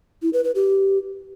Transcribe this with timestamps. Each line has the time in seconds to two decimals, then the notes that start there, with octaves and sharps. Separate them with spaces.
0.22 E4
0.33 B4
0.44 B4
0.55 G4